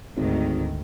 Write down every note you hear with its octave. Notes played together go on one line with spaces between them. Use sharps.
G#1 D2 G#2 D#3